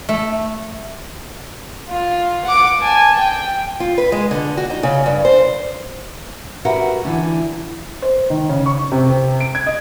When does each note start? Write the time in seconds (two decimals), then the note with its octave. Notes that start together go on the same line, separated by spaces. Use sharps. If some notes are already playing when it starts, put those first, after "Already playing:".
0.09 A3
1.88 F4
2.45 F#5 D6
2.80 G#5 A5
3.17 G5
3.80 F4
3.98 B4
4.12 G#3
4.31 D3
4.57 F#4
4.70 D#4
4.83 C#3
5.06 G2
5.25 C5
6.65 F#4 G4 A#4 B4 E5 F#5
7.05 D3 E3
8.02 C5
8.30 D#3
8.49 C#3
8.66 C#6
8.92 C3
9.10 C3
9.40 D7
9.55 G#6
9.67 D#5